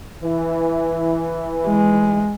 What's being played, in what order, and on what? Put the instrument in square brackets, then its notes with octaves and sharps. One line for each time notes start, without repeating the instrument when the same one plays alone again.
[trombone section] E3
[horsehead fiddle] G#3